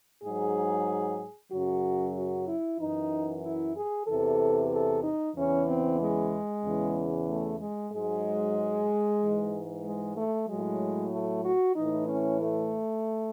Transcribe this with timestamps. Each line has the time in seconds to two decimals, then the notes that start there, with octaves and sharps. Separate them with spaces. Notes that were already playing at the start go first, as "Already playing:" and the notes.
0.23 G#2 F#3 G#4
1.52 F#2 C#3 F#3 F#4
2.16 F#4
2.47 E4
2.79 F#2 E3 D#4
3.44 E4
3.76 G#4
4.08 E2 C3 E3 A4
4.72 A4
5.04 D#4
5.36 E2 C#3 E3 C#4
5.68 C4
6.00 G#3
6.65 E2 C#3 E3
7.28 A3
7.60 G#3
7.92 G#2 F#3 G#3
9.20 G#2 E3
9.84 G#3
10.17 A3
10.48 F#3 G#3
10.53 A2
11.12 A3
11.45 F#4
11.76 A2 E3 D#4
12.09 C#4
12.41 A3